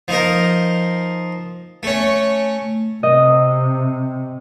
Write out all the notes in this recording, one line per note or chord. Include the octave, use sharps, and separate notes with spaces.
F3 D#4 A#4
A3 C#4
C3 D#5